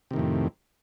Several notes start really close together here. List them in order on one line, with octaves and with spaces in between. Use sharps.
C3 D#3 A2 F2